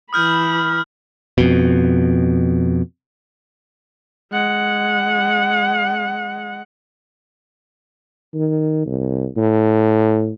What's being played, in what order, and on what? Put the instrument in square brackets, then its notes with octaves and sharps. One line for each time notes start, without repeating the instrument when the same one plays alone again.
[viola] E3 B5 [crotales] D#6 F6 G6
[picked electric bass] F2 B2
[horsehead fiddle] G#3 F#5
[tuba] D#3
C2
A2